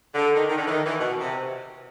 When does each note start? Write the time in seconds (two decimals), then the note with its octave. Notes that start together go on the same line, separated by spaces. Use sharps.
0.14 D3
0.35 D#3
0.50 D#3
0.57 D3
0.67 E3
0.71 D#3
0.86 E3
0.99 B2
1.21 C3